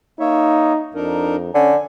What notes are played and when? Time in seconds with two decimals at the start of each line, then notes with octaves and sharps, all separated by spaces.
0.20 A#3 D#4 C#5 E5
0.95 F2 D4 D#4 A#4
1.55 D3 C#4 G#5